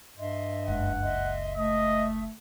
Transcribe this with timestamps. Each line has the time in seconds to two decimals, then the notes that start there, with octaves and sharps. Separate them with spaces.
0.18 G2 D#5 E5 C6
0.68 F#1 C#2 F#5
1.02 D#5 E5 C6
1.57 A3 D#5 E5 D#6